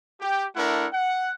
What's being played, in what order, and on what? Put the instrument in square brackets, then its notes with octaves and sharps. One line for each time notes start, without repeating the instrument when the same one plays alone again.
[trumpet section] G4
A3 D4 E4 A#4 F#5
F#5